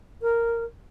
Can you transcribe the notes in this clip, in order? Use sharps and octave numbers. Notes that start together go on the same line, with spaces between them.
A#4